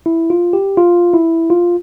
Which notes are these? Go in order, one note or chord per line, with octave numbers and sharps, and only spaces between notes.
E4
F4
G4
F4
E4
F4